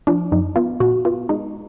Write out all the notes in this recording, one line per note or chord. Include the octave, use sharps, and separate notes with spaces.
F3 D4
F#2 D#4
B3 F4
A#2 F#4
B3 F4
G#3 D#4